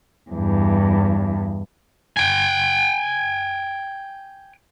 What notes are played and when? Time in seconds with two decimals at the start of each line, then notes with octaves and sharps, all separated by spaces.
0.31 E2 G2
2.17 G5 G#5